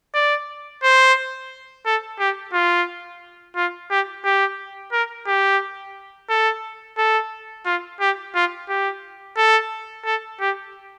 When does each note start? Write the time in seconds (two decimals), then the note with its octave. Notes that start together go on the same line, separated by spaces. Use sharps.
0.14 D5
0.83 C5
1.85 A4
2.19 G4
2.53 F4
3.56 F4
3.90 G4
4.24 G4
4.92 A#4
5.27 G4
6.29 A4
6.98 A4
7.66 F4
8.00 G4
8.35 F4
8.69 G4
9.37 A4
10.05 A4
10.40 G4